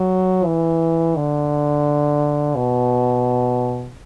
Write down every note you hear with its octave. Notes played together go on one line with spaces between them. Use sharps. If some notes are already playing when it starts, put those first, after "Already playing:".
Already playing: F#3
E3
D3
B2